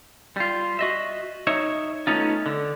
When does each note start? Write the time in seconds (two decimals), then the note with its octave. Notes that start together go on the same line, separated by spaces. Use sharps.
0.37 G3 F4
0.79 F#4 D#5 E5
1.47 D#4 C#5 E5
2.07 A3 B3 C#4 D#4 F4
2.46 D3